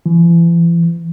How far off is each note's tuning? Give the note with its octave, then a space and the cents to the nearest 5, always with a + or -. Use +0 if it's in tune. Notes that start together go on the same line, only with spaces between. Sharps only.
E3 +40